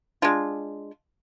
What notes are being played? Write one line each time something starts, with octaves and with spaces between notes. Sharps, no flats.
G#3 D4 F4